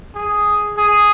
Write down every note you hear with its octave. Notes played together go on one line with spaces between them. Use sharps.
G#4
G#4